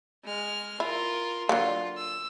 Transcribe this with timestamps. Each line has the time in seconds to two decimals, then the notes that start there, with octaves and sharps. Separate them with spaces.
0.24 G#3 F6
0.80 E4 F4 A#4
1.49 D3 F#3 A#3 F4
1.97 E6